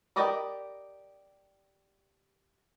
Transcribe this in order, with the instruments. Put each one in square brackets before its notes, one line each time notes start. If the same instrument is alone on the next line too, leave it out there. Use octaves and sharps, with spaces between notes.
[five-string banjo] G4 A#4 D5 D#5 B5